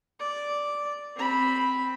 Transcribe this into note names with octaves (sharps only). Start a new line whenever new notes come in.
D5
C4 B5